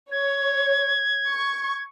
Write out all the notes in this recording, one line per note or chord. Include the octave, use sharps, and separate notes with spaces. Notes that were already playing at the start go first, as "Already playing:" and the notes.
C#5 G#6
C#6